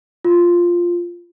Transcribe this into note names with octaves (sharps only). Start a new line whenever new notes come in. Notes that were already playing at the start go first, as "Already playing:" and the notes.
F4